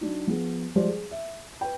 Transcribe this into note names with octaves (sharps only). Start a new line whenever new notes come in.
F#3 D4 D#4
F3 B3 G#4
F3 G3 G#3 G4 C5 D5
G#4
E5
B4 G5